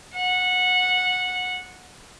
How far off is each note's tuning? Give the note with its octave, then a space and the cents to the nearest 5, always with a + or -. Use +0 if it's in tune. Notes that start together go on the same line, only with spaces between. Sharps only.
F#5 -15